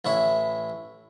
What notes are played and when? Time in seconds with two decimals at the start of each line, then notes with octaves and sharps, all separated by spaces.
0.05 A1 E4 C#5 E5